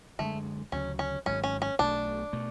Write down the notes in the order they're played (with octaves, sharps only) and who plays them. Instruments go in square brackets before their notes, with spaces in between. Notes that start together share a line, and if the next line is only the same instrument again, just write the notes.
[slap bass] F#2 D3 G#3 [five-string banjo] A3
[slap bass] D2 C#3 F#3 [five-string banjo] C#4
[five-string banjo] C#4
[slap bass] G#1 G#2 F#3 [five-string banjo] C#4
[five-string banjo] C#4
C#4
[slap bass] B1 B2 A3 [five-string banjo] D4
[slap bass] B2 A3